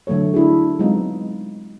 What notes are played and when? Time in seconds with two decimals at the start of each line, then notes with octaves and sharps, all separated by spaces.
0.07 D3 F#3 A3 A4 C#5
0.34 D4 E4 F#4 G#4
0.79 F#3 G#3 B3 C4 D#4 F4